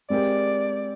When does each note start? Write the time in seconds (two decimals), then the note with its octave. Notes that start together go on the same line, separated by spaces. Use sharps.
0.10 G#3 C4 G4 A#4 D5